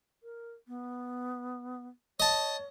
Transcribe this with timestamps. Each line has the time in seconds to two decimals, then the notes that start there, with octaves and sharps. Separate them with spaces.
0.23 A#4
0.68 B3
2.20 C#5 D#5 A5